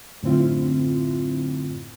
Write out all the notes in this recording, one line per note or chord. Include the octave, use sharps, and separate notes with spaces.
F#2 A2 D3 C4 E4 F4